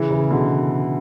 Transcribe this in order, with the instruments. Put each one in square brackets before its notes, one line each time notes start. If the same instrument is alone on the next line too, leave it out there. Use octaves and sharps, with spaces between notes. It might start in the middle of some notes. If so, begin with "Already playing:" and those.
Already playing: [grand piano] C#3 [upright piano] E3
[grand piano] C#3
[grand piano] B2 [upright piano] D3